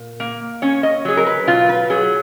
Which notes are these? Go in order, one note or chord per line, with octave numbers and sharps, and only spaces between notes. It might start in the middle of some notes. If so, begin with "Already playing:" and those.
Already playing: A#2
A#3
C#4 C#5
D#5
F#3 G#4
A#4
B4
B2 F4
B4
F#3 G#4